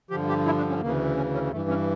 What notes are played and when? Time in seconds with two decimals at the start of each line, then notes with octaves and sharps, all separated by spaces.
0.10 G2 D3 F3 G4
0.29 G4
0.46 E4
0.57 D4
0.69 C#4
0.81 D2 C#3 E3 A#3
1.17 C#4
1.34 C#4
1.52 G2 E3 A3
1.69 C#4